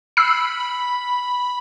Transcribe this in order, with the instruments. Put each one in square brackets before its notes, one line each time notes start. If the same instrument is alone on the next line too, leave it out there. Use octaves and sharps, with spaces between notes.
[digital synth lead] B5 [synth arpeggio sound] E6 C7